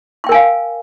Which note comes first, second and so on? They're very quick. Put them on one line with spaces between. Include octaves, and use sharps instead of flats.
C6 G5 A#4 G#5 F5